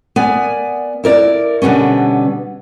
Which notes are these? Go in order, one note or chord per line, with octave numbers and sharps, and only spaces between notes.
B3 A#4 D5 G#5
E4 A#4 D5
B2 D3 G3 B3 C#4